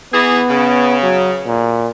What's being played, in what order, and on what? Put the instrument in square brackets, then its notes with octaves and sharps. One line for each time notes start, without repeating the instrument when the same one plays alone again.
[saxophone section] E3 G#4 [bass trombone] B3
[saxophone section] C#3
[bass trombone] F#3
A#2